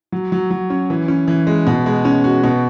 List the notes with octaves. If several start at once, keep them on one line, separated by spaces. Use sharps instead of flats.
F#3
F#3
F#3
C#4
E3
C#4
E3
G#3
B2
G#3
C#4
F#4
B2